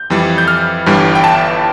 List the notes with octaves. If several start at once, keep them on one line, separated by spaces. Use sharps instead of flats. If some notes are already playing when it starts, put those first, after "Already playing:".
Already playing: G6
F2 E3 G3
G6
F6
G1 G2 E3 G3
G5
A5